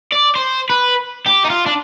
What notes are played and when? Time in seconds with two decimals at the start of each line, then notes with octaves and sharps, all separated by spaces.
0.13 D5
0.36 C5
0.70 B4
1.26 G4
1.44 D#4
1.50 F4
1.66 D4